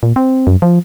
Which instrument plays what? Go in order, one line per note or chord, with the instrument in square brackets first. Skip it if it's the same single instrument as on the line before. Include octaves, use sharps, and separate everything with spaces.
[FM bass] A#2
C4
F#2
F3